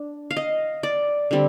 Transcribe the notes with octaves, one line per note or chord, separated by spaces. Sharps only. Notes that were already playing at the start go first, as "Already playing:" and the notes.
Already playing: D4
F5
D#5
D5
D3 G3 C4